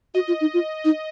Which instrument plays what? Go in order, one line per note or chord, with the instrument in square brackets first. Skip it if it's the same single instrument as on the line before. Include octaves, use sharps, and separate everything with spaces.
[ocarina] F#4 [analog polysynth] D#5
[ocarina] F4
D#4
F4
D#4